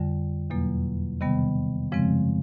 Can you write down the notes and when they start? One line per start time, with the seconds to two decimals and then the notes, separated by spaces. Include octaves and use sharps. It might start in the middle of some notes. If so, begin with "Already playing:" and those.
Already playing: F2 D3 G3
0.50 E2 B2 F#3 A#3
1.21 C3 D#3 G3 B3
1.92 F#2 C#3 F3 G#3 C4